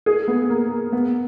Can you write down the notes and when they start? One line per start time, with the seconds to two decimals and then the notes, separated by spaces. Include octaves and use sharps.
0.06 G#4
0.28 B3
0.49 A#3
0.92 B3